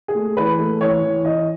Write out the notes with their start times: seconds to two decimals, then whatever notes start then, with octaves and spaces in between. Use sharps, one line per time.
0.08 G#4
0.15 A3
0.37 E3 B4
0.59 A3
0.81 E3 C#5
1.03 E3
1.25 E3 D#5